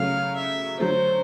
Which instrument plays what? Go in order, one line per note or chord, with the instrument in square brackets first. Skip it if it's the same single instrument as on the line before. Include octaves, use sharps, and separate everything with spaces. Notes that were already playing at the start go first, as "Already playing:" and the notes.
Already playing: [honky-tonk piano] C#3 F#3 A3 [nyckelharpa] F5
[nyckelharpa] E5
[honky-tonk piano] D3 F#3 A3 [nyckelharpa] C5